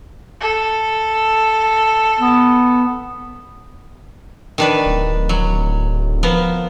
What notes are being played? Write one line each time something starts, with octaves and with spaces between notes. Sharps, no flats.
A4
B3
D#3 D4 B4
D1
F#3
F3 B3 A#4